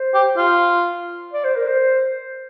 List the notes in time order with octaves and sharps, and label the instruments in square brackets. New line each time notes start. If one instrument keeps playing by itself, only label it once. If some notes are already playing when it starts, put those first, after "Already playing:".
Already playing: [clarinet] C5
[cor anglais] G4
F4
[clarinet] D5
C5
A#4
C5